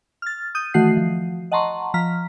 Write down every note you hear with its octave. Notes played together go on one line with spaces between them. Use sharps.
F6 A6
D#6 G6 D#7
D#3 E3 A3 F#4 F#5 C7
F3
D#5 F#5 A5 A#5 C6 C#6
F3 A#5 F6 B6